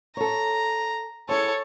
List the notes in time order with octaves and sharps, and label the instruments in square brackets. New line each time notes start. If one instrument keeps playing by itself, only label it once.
[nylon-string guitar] A4 C#5 [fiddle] A#5
[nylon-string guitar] E4 G#4 [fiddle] A4 C#5